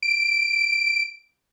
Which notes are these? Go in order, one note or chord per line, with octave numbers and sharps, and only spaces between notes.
D7